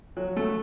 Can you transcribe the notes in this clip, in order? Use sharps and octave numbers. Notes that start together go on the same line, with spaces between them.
F#3
A3